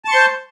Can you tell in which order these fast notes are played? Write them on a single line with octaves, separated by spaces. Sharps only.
A5 C#6 C6 C5